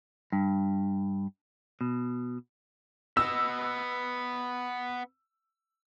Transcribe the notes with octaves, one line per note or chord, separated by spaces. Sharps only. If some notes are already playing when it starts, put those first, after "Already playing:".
G2
B2
B3 D#5 E6